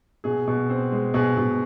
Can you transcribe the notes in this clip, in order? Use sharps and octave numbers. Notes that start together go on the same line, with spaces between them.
B2 G#4
B2
C4
G#3
B2 G#4
B2